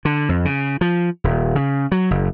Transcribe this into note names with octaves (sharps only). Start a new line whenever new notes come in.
D3
F2
C#3
F3
D#1
C#3
F#3
F#1